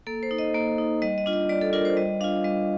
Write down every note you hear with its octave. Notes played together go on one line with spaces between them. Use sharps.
A#3 A4
C5
D#4
D#5
A#3
D#4
G3 D#5
D#5
D4 F4
D#5
G3 D5
A4
D4 F4 A#4
C5
G3 D#5
D4 F4 F5
G3 D#5